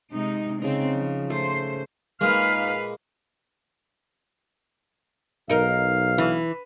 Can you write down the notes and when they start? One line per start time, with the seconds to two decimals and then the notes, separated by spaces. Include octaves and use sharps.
0.11 C3 G#3 D#4
0.62 C#3 C4 D#4
0.94 F3
1.30 A3 C5
2.21 A#2 G#3 D#4 B4 F5 F6
5.50 B1 D#4 A#4 F5
6.18 E3